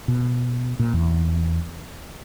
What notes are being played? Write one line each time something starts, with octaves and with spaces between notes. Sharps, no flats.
B2
A#2
E2